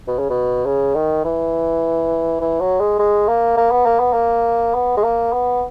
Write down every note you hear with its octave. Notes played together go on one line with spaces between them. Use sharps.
B2
C#3
B2
C#3
D#3
E3
E3
F#3
G#3
G#3
A#3
A#3
B3
A#3
B3
A#3
B3
G#3
A#3
B3